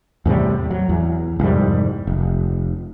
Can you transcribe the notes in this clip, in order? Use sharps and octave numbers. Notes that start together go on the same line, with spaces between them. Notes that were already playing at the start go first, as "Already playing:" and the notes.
E2 A2 C3 G3
F#3
E2
C2 F2 G#2 G3
F1